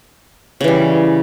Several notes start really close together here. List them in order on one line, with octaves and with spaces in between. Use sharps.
C#3 E3 G3